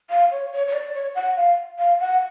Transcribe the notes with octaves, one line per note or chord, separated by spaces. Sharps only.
F5
C#5
C#5
C#5
D5
C#5
F#5
F5
F5
F#5